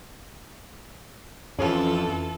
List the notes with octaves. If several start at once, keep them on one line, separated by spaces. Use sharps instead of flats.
F2 E3 C#4 F4 A4